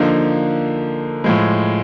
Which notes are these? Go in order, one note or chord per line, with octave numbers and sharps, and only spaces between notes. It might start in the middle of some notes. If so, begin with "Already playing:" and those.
Already playing: D3 F3 A#3 D#4
A2 F3 G#3